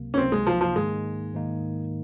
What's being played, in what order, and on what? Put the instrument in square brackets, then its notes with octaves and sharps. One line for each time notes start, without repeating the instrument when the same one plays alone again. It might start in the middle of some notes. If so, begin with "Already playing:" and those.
Already playing: [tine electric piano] C#2 C3 F#3 A#3
[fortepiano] C#4
[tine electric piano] C#2 C3 F#3 A#3 [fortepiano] C4
[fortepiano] G#3
F3
F3
[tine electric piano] G#2 D#3 A#3 D#4 [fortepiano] G#3
[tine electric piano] G#2 D#3 A#3 D#4